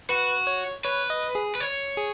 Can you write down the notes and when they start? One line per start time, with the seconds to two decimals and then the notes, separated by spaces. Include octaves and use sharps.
0.09 F#4 B4
0.47 C#5
0.85 B4 C#5
1.10 D#5
1.35 G#4
1.55 B4
1.60 C#5
1.97 G#4